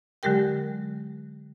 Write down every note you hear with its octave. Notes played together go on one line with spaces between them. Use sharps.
D3 F#3 G#3 G4 A#4 G5